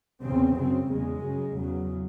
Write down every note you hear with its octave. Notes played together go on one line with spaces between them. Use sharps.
E2 C#3 C4
F#2 C#3 C4
E2 C#3 G#3
F#2 C#3
E2 C#3 F#3